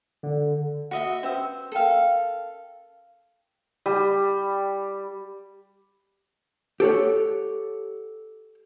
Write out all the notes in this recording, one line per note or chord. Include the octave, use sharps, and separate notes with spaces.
D3
F#4 D#5 E5
C#4 B4 C5 E6
A4 A#4 F5 G5
G3
G4 A4 C#5 F#5